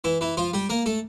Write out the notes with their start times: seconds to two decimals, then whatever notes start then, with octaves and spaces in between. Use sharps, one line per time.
0.04 E3 E4
0.21 E3 E4
0.37 F3 F4
0.54 G3 G4
0.70 A#3 A#4
0.86 A3 A4